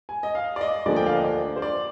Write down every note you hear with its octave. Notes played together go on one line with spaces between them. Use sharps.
G#5
D#5
F5
D5
D#5
D2 D3 F3 A#3 D4 D5
G5
F5
D#5
D5
C5
D5